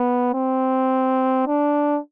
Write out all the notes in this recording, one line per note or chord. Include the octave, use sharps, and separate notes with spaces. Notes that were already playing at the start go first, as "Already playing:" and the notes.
Already playing: B3
C4
D4